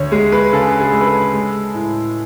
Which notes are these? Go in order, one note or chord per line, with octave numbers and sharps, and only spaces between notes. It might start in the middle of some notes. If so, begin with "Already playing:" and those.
Already playing: D2 C#5
G#3 G#4
B4
C#3 A4
G#4
G#3
B4
A4
G#3
A2